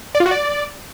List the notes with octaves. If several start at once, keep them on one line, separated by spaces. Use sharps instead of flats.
D5
F4
F#4
D5